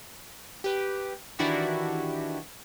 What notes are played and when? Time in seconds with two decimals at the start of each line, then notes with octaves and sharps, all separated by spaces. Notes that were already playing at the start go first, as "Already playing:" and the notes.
0.64 G4 B4
1.39 D#3 E3 D4 E4 F#4 G4